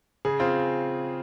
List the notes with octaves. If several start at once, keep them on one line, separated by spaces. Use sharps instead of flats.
C#3 G#4
C4 F4